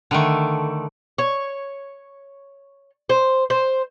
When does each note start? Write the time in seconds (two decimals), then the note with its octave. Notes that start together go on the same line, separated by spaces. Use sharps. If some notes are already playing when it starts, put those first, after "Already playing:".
0.11 D3 D#3 A3
1.18 C#5
3.09 C5
3.50 C5